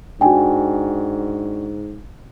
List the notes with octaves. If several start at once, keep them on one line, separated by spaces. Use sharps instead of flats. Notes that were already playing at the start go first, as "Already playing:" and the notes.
G#2 D4 F#4 G5 G#5